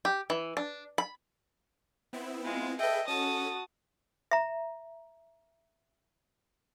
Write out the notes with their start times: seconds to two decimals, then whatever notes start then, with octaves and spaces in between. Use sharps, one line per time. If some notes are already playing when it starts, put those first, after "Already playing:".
0.05 G4
0.30 E3
0.57 D4
0.98 B5
2.13 B3 C4 E4
2.44 G#3 F4
2.79 G#4 A4 B4 D#5 E5 G5
3.08 C#4 F#4 A4 A5 D#6
4.31 E5 A#5